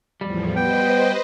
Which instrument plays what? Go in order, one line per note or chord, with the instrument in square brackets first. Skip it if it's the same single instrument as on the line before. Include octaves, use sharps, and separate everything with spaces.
[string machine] E2 A2 F3 [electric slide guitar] G3
[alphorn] B3 [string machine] B4 C5 D#5 [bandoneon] G5